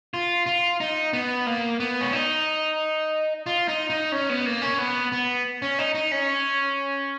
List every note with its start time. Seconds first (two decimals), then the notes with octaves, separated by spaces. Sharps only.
0.14 F4
0.46 F4
0.80 D#4
1.13 B3
1.46 A#3
1.80 B3
2.01 C#4
2.13 D#4
3.46 F4
3.68 D#4
3.90 D#4
4.12 C#4
4.30 B3
4.46 A#3
4.62 C#4
4.78 B3
5.12 B3
5.62 C#4
5.79 D#4
5.95 D#4
6.12 C#4